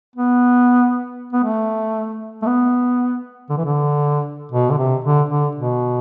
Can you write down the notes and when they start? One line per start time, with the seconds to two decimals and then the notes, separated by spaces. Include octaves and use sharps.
0.16 B3
1.33 B3
1.44 A3
2.42 A3
2.46 B3
3.50 D3
3.57 E3
3.65 D3
4.52 B2
4.70 D3
4.78 C3
5.04 D3
5.29 D3
5.55 B2